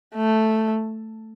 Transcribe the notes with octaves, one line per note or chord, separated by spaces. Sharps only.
A3